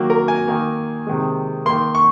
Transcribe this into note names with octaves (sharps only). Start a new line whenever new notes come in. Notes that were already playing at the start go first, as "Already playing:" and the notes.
Already playing: D#3 F#3 A#3
A#4
G#5
D#3 A#3
C3 D#3 G#3
D#3 A#3 C6
C#6